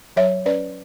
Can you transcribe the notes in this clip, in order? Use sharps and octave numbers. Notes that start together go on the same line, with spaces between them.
F#3 C#5 E5
C#4 B4 D5